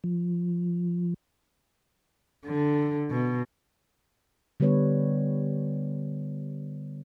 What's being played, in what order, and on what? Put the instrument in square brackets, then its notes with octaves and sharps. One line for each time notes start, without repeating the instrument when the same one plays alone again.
[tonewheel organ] F3
[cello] D3
B2
[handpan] D3 G3 B3 B4 C#5